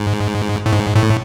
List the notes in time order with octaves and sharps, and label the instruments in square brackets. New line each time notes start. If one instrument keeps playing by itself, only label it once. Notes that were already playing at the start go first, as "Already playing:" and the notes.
Already playing: [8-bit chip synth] G#2
A2
G#2
A2